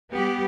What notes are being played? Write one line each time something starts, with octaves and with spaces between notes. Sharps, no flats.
G3 B3 G4